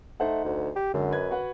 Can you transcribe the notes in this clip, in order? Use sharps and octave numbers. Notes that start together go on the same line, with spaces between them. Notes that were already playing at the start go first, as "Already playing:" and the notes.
A3 D#4 C5 F#5
D2
G4
F#2 D3 G#3
B4 D#5 G#6
F#4 B4 F#5